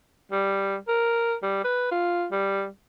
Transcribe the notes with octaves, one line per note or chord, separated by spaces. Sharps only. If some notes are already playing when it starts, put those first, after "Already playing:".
G3
A#4
G3
B4
F4
G3